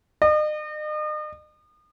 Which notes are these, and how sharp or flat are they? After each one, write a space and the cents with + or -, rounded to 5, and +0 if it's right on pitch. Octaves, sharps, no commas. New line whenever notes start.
D#5 -40